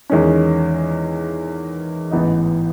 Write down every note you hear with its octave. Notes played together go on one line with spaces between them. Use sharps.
E2 D#3 G#3 C#4
A1 G#2 E3 B3 D#4